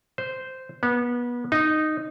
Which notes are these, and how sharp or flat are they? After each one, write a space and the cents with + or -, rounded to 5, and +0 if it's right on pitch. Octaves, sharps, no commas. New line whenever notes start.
C5 -10
B3 -25
D#4 -10